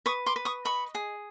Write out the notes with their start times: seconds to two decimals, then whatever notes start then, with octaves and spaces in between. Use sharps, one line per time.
0.06 B4 C#6 D#6
0.26 C6 D6
0.36 B4
0.45 C#6 D#6
0.65 D#5 B5 C#6
0.95 G#4